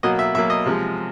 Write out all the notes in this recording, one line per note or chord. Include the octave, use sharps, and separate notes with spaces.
B2 F#3 A#3 D#5
E5
B2 F#3 A#3 E5
D#5
C3 F3 G#3